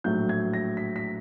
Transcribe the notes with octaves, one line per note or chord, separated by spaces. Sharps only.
A#1 A2 F#3 G6
G#6
A#6
B6
B6